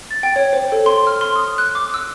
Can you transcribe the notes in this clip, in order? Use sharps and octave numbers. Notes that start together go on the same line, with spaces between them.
A6
G5
C#5
C5
A4
C6
F6
C6
D#6
F#6
D6
E6